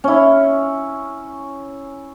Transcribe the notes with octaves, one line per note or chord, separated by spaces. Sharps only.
C#4 E4